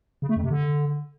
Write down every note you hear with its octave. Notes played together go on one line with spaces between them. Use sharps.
C#3
A3
F2
C3
D3